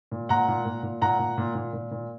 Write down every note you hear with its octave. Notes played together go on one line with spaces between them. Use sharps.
A#2
A#2 F#5 A#5
A#2
A#2
A#2
A#2 F#5 A#5
A#2
A#2
A#2
A#2
A#2